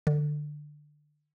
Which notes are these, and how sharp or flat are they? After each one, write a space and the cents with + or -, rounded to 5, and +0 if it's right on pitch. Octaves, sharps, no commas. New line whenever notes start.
D3 +20